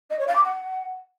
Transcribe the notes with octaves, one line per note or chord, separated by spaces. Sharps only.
D#5
C#5
F5
D6
F#5